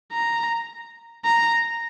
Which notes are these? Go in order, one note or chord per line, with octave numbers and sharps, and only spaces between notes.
A#5
A#5